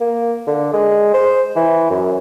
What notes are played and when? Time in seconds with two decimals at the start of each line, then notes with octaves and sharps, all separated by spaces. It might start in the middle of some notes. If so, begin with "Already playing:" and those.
0.01 A#3
0.47 D3
0.73 G#3
1.14 C5
1.56 E3
1.90 F#2